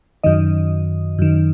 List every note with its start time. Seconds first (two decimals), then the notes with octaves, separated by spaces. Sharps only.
0.24 F#2 D#3 D#5
1.19 F#2 D#3